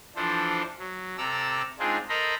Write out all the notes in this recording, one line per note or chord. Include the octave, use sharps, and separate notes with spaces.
E3 F3 D4 A4 C5
F#3
C3 A4 D5 A#5 E6
G#3 C4 D4 D#4 F4 G#4
A4 A#4 C5 D#5 A#5 B5